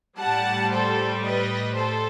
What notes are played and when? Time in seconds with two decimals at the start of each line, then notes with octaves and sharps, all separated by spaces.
0.18 A2 G3 F#5 A5
0.70 A4 C5
1.22 B4 D#5
1.75 A4 C5